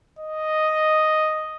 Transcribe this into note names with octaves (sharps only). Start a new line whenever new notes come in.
D#5